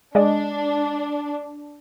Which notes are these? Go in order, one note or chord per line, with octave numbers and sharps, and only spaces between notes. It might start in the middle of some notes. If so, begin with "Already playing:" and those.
G#3 D4 D5 D#5